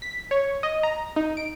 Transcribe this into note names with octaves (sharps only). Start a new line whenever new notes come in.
B6
C#5
D#5
A#5
D#4
D7